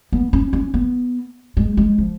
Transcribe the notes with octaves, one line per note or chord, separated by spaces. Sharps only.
B3
C#4
C#4
B3
G#3
G#3
F3